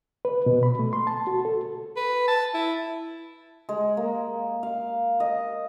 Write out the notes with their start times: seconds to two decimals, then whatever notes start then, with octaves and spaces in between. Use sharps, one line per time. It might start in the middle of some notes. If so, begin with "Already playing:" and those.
0.25 B4
0.46 B2
0.63 B5
0.79 A3
0.93 C6
1.07 A5
1.27 F#4
1.45 A4
1.96 B4
2.28 A5
2.54 E4
3.69 G#3
3.97 A#3
4.63 F5
5.20 D#5